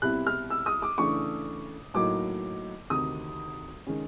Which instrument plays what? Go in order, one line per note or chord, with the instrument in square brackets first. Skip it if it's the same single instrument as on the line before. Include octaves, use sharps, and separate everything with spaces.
[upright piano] C2 B2 G3 C4 E4 F#6
F6
E6
D#6
D6
C#3 E3 A3 D4 C#6
A2 F#3 A#3 D#4 D6
D2 C3 D#3 D#6
D#3 G#3 C#4